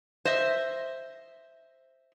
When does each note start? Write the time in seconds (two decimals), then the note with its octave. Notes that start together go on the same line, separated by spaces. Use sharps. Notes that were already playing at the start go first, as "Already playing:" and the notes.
0.25 C5 D#5 E5